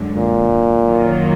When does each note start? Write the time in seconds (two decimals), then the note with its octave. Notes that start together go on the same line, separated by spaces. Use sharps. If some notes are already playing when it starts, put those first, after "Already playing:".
Already playing: F#2 D3 G#3
0.15 A#2
0.87 F#2 D#3 F#3 A#3 F4